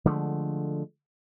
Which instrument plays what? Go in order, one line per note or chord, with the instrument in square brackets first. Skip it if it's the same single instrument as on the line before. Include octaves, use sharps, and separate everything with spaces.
[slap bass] D3 F3 G#3 A3